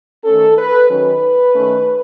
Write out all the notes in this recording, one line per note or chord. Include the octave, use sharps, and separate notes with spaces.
D#3 A3 C#4 A4
B4
D#3 F#3 C#4 B4
D#3 A3 C#4